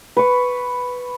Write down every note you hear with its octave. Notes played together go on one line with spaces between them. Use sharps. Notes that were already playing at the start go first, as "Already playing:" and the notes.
B4 C#6